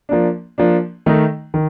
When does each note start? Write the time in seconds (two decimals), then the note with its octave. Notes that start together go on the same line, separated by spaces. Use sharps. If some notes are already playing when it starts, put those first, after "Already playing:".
0.09 F3 A#3 D4
0.58 F3 A#3 D4
1.06 D#3 A3 D#4
1.54 D#3